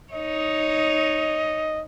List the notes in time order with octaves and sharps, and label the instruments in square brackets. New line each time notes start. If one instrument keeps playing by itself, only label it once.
[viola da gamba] D#4 C#5 [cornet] D#5